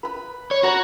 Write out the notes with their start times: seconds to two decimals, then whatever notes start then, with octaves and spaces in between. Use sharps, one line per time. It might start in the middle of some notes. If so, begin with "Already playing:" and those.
0.03 B4 B5
0.51 C#5
0.63 F#4 C#5 A#5